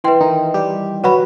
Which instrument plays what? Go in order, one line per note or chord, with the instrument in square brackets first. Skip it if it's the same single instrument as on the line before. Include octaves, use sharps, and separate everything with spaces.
[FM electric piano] E3 [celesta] B4 E5 G5 C6
[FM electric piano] D#3 D#4
G3 G4
[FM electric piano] F#3 F#4 [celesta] B4 F#5 B5